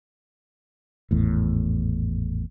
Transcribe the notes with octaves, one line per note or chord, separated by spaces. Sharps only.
G#1 E2 A2